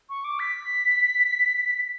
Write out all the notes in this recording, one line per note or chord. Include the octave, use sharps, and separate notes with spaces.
C#6
D6
B6